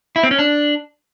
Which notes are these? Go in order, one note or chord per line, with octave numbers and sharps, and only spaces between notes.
E4
C4
C#4
D4